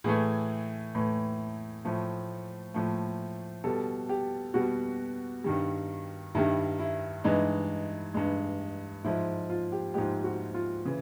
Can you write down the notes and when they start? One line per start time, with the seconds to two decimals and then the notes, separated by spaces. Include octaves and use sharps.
0.04 A2 E3 A3 G#4
0.95 A2 E3 A3
1.85 A2 F3 A3
2.74 A2 F3 A3
3.64 B2 G3 A4
4.09 G4
4.54 B2 G3 F#4
5.44 G2 D#3 G3
6.35 G2 D#3 G3 E4
6.79 E4
7.24 G2 E3 G#3 D#4
8.14 G2 E3 G#3
9.04 G#2 F3 G#3 E4
9.50 F4
9.72 G4
9.94 G#2 F3 G#3 G4
10.24 F#4
10.54 F4
10.85 C#3 E3